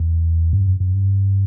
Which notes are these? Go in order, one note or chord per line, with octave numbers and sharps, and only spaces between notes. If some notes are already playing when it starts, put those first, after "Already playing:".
Already playing: E2
G2
F#2
F#2
G2